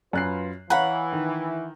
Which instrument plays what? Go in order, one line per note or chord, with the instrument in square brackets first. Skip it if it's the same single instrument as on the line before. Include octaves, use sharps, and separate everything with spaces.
[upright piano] F#2 F#6 C7 [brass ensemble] F4 B4
[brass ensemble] E3 [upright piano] C#5 F5 A#5 [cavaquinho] F#5 B5
[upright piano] D#3